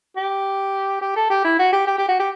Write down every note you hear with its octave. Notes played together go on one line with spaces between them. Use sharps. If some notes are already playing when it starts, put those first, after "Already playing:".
G4
G4
A4
G4
E4
F#4
G4
G4
G4
F#4
G4